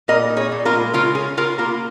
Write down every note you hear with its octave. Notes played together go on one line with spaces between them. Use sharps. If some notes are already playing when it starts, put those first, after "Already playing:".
A#2 A#4 D#5
D#4
G#4 C#5
A#2
F4 A#4
G#3
C#3 F4 A#4
C#4 G#4
C#3 F4 A#4
A#3 F4 A#4